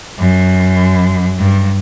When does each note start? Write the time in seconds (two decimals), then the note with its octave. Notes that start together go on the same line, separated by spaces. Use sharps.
0.19 F#2
1.39 G2